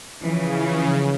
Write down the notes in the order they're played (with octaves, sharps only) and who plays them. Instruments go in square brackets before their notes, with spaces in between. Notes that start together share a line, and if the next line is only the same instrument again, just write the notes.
[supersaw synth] C#3 [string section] E3 F3